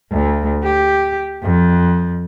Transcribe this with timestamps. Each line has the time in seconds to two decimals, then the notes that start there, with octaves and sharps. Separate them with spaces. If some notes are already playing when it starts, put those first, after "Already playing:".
0.11 D2
0.63 G4
1.43 F2